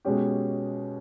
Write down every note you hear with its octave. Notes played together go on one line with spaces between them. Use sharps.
B2 G#3 C#4 G4